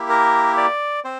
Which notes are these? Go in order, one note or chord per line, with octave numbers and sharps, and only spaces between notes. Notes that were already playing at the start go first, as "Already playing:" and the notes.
Already playing: A#3 E4 G4
A#4
D5
C4 C5